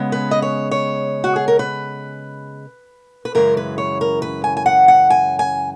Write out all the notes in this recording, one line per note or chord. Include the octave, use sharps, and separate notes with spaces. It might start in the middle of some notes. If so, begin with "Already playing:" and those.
Already playing: C#3 G#3 B3
B4
D#5
C#5
C#5
F#4
G#4
A#4
B4
B4
F#2 C#3 E3 G#3 A#4
B4
C#5
A#4
B4
G#5
G#5
F#5
F#5
G#5
G#5